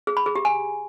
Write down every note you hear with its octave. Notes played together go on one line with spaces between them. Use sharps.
G#4
B5
G#4
G4
G#5